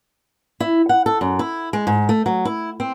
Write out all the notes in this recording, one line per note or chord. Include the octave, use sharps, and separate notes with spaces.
E4
F#5
A4
F#2
E4
G#3
G#2
A3
F#3
E4
C4